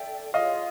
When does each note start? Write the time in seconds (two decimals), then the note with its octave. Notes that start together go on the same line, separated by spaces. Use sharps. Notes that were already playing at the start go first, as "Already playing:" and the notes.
Already playing: A4 D5 E5 G5
0.34 F4 G#4 C#5 D#5 F5